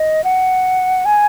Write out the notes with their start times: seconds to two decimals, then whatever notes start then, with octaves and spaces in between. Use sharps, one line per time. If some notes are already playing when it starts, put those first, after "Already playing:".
Already playing: D#5
0.24 F#5
1.05 G#5